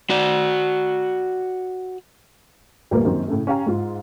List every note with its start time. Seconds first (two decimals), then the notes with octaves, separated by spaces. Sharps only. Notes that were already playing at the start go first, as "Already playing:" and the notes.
0.10 F#4 D5
2.91 D2 A#2 G3 A#3 B3
3.04 F#2 D#3 A#3 C4
3.28 A2 C#3 A3
3.47 C#4 G4 F5 G5 A#5
3.66 G#2 F4